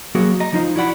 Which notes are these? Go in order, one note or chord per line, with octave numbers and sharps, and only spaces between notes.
F#3 A#3 F#4 G#4 A#4
D#5 A#5
F3 D#4 F4
E4 F#4 D5 F#5 B5